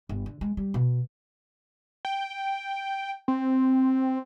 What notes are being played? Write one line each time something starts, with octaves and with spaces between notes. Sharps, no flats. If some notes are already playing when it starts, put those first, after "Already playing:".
G1
D3
G#3
G3
B2
G5
C4